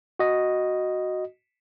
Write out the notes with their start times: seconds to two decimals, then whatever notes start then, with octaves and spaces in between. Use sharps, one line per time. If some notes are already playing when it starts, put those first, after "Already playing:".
0.19 F#4 D#5